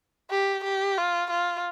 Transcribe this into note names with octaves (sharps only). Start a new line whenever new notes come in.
G4
G4
F4
F4